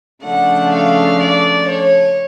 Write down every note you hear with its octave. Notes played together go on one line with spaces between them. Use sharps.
C#3 F3 A3 D4 F#5
F5
D5
C#5